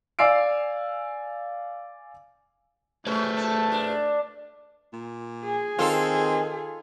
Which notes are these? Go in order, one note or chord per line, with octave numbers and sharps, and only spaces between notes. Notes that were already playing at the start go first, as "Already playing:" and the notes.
D5 F5 G#5 E6 C7 D7
A3 C#4 G#4 B4 C5
A4
D4
A#2
G#4
D#3 C4 F4 A4